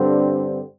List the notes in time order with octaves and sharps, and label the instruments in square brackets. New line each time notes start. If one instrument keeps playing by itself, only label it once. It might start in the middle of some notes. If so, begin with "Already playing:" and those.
Already playing: [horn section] G2 D3 G3 C4